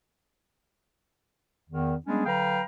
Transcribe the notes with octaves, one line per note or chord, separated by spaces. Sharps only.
E2 D#3
G3 G#3 B3 C#4 D4 G#4
D3 F#3 B4 F5 G5 A#5